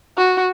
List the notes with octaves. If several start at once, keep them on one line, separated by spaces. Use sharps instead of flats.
F#4